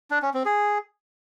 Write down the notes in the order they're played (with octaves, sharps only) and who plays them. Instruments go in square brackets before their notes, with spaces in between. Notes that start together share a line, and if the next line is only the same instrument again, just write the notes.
[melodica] D4
C#4
C4
G#4